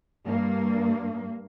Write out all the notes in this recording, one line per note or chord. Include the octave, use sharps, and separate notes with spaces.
G2 A#3